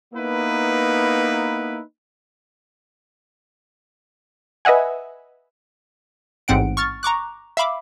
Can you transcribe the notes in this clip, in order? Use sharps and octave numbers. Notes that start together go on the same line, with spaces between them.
A#3 B3 D#4 E4 B4
B4 D#5 E5 F#5 G#5
A1 G#2 C4 F#5 D7
C#6 F6 A6
A#5 C#6 D6 F#6
E5 F5 B5 D6